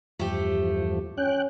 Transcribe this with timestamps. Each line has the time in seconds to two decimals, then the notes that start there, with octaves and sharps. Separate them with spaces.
0.19 E2 G2 F3 A3 G4
1.18 C#4 G5 F#6